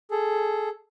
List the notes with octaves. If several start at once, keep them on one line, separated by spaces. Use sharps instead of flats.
G#4 A4